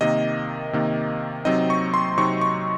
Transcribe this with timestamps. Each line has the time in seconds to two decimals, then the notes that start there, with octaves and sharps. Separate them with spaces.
0.01 C3 D#3 A#3 D#5
0.73 C3 D#3 A#3
1.45 C3 F#3 C4 D#4 D#5
1.70 C#6
1.94 C6
2.17 C3 F#3 C4 D#4 C#6
2.41 C#6